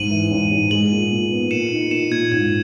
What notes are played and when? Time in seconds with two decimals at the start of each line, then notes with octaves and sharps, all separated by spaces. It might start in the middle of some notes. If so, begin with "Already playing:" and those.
Already playing: G#2 D#7 F#7
0.10 E3
0.31 G#2
0.51 G#2
0.71 G#3 D#7 F#7
0.92 A#2
1.11 A#2
1.31 B3
1.51 A#2 C#7 E7
1.72 D#4
1.91 A#2 C#7 E7
2.11 A#2 G#6
2.31 G#2 G#6